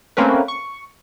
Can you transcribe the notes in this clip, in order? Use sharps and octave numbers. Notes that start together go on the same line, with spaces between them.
A3 A#3 C4 C#4 A#4 B4
C#6